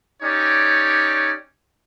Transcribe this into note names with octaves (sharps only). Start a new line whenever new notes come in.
C#4 D#4 G4 C#5 D5